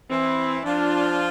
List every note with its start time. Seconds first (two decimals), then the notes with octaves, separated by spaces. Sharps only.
0.10 E3 C4 E4
0.65 F3 D4 F4